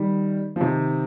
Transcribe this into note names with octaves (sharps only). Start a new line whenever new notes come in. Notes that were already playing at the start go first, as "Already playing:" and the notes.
Already playing: D#3 G3
F3
C3 D#3